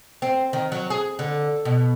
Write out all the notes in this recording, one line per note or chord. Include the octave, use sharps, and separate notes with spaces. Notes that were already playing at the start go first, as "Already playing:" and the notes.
C4
D#3
F#3
G#4
D3
B2